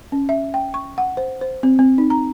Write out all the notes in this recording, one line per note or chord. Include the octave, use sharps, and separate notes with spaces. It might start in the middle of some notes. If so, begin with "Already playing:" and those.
C#4
E5
G5
C#6
F#5
C5
C5
C4
C4
D#4
A#5